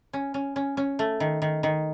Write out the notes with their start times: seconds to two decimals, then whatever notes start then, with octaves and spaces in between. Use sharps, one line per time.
0.13 C#4
0.34 C#4
0.56 C#4
0.77 C#4
0.99 A3
1.20 D#3
1.42 D#3
1.63 D#3